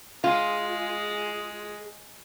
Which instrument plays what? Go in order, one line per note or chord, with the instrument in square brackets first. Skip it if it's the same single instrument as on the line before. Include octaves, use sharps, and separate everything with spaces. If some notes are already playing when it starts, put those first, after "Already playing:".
[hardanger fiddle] G#3 [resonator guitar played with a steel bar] F4 [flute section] G#4